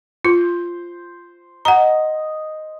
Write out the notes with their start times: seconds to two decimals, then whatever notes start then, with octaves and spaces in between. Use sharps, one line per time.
0.25 F4 C5
1.65 D#5 F#5 A#5